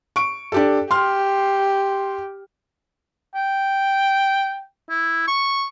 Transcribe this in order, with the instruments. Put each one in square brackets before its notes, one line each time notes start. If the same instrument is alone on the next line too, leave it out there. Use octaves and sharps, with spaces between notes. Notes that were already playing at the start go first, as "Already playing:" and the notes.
[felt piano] C#6 D7
D4 G4 A4
[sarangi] G4 [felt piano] C6 F6
[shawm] G5
E4
C#6